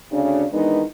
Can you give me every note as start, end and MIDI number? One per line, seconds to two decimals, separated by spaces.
0.12 0.44 38
0.12 0.44 49
0.12 0.44 62
0.52 0.82 51
0.52 0.82 52
0.52 0.82 56
0.52 0.82 59
0.52 0.82 62
0.52 0.82 63